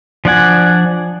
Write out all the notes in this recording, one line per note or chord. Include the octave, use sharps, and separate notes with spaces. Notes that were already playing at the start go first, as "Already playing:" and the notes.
F3 D4 D5 F#5 G#5